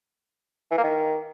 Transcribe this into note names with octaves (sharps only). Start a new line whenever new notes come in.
E3
A#3
D#3